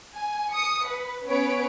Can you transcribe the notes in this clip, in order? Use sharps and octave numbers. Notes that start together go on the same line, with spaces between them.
G#5
D#6 C#7
B4
B3 C#4 B4 C#5 D7